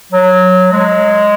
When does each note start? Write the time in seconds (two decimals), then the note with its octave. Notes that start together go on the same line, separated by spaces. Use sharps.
0.12 F#3
0.73 G#3